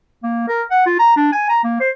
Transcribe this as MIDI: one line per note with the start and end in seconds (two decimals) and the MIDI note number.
0.23 0.45 58
0.48 0.63 70
0.71 0.83 78
0.86 0.96 65
0.99 1.15 82
1.17 1.32 62
1.32 1.47 80
1.49 1.60 82
1.64 1.79 58
1.80 1.90 72